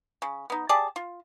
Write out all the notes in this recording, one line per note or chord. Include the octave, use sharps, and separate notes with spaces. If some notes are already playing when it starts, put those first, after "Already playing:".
C#3
B3 D#4
G4 G#4 D5 A5
F4